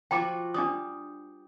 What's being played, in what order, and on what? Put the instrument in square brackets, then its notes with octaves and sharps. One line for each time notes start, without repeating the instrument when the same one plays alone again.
[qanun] F3 F4 F#4 [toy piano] G5 B5 D6
[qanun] G3 [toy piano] D4 D6 D#6